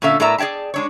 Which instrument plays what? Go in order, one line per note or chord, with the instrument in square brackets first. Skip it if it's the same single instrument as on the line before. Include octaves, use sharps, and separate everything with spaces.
[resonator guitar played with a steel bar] A#2 D3 C#4 A4 E5 F5
A2 B3 A#4 D5 E5 A#5
G#4 D5 E5 G5 A5
G#3 D4 C#5